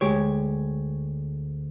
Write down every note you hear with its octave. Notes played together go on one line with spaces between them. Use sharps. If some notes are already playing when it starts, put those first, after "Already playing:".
D2 G#3 G4 C#5